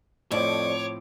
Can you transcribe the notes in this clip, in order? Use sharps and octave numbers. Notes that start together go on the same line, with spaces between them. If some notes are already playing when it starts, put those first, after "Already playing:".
F2 A2 F3 C4 C#5 D5 D6